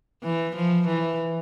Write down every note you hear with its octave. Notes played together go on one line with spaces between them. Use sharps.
E3
F3
E3